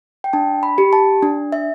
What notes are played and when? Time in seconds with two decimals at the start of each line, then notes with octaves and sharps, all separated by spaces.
0.24 G5
0.33 D4 A5
0.63 B5
0.78 G4
0.93 A5
1.23 D4
1.52 E5